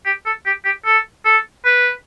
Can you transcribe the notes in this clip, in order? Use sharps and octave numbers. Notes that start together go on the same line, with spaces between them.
G4
A4
G4
G4
A4
A4
B4